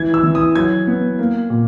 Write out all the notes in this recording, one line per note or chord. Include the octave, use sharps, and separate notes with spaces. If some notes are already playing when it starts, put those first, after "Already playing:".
Already playing: E3 G#6
E6
E3
D#6
F#3 G#6
B3
A#3
A#2